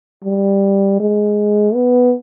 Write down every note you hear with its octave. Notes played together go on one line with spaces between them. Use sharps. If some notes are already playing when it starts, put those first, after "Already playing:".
G3
G#3
B3